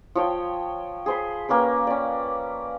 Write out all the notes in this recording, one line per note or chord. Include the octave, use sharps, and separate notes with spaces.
F3 C#5 G5
G#4 C5 B5
A#3 C#4 B4 G5
C#4 D5